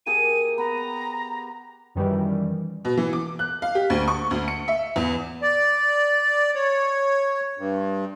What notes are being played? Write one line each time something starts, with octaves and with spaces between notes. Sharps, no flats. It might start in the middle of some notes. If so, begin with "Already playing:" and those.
A#3 G4 G#4 D#7
B3 A#5
F#2 D#3 E3 G3
B2
E3
D6
F#6
F5
G4
D2
C#6
D2
C#7
E5
E2
D5
C#5
G2